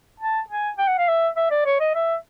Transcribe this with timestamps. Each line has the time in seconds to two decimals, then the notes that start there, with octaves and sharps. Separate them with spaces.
0.20 A5
0.50 G#5
0.78 G5
0.88 F#5
0.98 F5
1.08 E5
1.36 E5
1.51 D5
1.65 C#5
1.80 D#5
1.95 E5